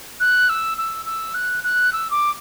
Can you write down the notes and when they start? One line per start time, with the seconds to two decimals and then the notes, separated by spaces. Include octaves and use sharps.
0.20 F#6
0.49 E6
0.78 E6
1.06 E6
1.34 F#6
1.64 F#6
1.93 E6
2.11 D6